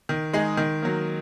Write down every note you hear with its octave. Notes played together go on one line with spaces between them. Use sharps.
D#3
G#3 D#4 G#4
D#3
F#3 A#3